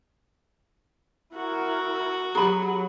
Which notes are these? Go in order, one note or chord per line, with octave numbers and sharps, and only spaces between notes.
E4 F#4 A#4
F#3 G4 G#4 A#5 B5